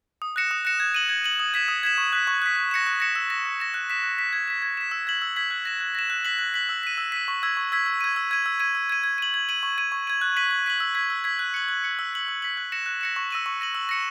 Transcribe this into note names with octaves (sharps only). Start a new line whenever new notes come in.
D#6
F#6 A#6 C#7 E7
D#6
F#6 A#6 C#7 E7
G#6
D#7 F#7
G#6
D#7 F#7
D#6
G#6 B6 E7
D#6
G#6 B6 E7
C#6
F#6 B6
C#6
F#6 B6
F#6
A#6 C#7 E7
F#6
A#6 C#7 E7
E6
A#6 E7
E6
A#6 E7
F#6
B6 E7
F#6
B6 E7
G#6
B6 E7
G#6
B6 E7
E6
G#6 B6 F#7
E6
G#6 B6 F#7
F#6
A#6 E7
F#6
A#6 E7
F#6
B6 F#7
F#6
B6 F#7
E6
B6 D#7
E6
B6 D#7
C#6
E6 G#6 B6
C#6
E6 G#6 B6
E6
G#6 D#7
E6
G#6 D#7
E6
G#6 D#7
E6
G#6 D#7
G#6
D#7 F#7
G#6
D#7 F#7
C#6
G#6 D#7
C#6
G#6 D#7
F#6
B6 D#7 F#7
F#6
B6 D#7 F#7
E6
G#6 B6
E6
G#6 B6
F#6
C#7 F#7
F#6
C#7 F#7
E6
B6 F#7
E6
B6 F#7
F#6
A#6 C#7 E7
F#6
A#6 C#7 E7
C#6
E6 A#6 D#7 F#7
C#6
E6 A#6 D#7 F#7
E6
A#6 C#7 E7